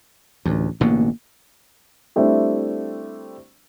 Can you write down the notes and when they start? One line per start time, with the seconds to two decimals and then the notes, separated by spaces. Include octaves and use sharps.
0.45 A1 D2
0.81 A1 B2 D3 A#3
2.16 G3 A3 C4 D4 E4